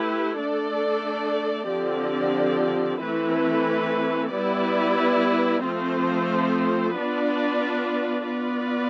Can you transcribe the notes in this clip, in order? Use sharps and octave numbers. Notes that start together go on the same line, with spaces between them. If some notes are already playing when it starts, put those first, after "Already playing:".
Already playing: A3 E4 G4 B4
A3 D4 A4 D5
D3 F3 C4 G4 D5
E3 A3 C4 E4 B4
G3 B3 E4 B4 D5
F3 A3 C4 F4 C5
B3 D4 F4 B4 D5
B3 F4 B4 D5